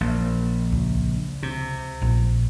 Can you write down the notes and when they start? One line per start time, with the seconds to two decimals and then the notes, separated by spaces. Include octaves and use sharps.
0.01 A#1
0.72 C#2
1.43 C3
2.02 A#1